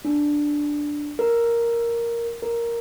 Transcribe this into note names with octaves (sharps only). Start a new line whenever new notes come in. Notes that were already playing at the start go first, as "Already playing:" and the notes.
D4
A#4
A#4